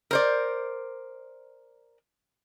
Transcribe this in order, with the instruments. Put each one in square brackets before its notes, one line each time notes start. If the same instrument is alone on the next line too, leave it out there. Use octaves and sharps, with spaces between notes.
[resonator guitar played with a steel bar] A#4 C5 D5